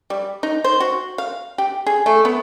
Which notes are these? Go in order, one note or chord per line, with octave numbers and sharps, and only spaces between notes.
G3
D#4
C5
F#4
F5
G4
G#4
A3
B3